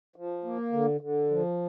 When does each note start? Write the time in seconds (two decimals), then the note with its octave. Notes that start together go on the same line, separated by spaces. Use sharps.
0.16 F3
0.44 A#3
0.72 D3
1.01 D3
1.30 F3